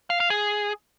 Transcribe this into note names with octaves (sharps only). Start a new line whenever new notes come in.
F5
F5
G#4